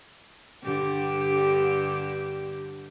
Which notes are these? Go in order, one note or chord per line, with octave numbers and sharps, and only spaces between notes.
G2 D3 G4